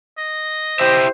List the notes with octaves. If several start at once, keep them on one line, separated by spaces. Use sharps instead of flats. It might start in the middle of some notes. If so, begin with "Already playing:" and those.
D#5
E4 G4 C5 E5